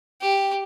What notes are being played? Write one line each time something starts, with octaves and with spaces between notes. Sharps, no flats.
G4